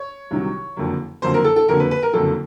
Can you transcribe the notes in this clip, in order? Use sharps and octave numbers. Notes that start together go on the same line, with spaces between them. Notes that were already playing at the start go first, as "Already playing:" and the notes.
Already playing: C#5
C2 C3 D#3 F#3
F#1 F2 D3 F#3 A#3
F#1 F2 D3 F#3 A#3 C5
A#4
A4
A4
F#1 F2 D3 F#3 A#3 A#4
B4
B4
A#4
F#1 F2 D3 F#3 A#3 A4